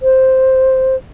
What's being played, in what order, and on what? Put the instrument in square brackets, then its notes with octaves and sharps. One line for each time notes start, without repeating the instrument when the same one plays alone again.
[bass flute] C5